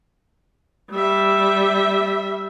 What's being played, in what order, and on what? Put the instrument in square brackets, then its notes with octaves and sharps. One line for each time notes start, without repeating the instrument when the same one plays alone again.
[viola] G3 E5